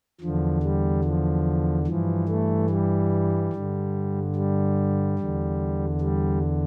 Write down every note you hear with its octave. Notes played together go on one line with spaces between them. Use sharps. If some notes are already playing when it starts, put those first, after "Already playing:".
E2 D3 F3
G3
F3
G2 E3 F3
A3
G3
G2 D3
G3
E2 D3
G3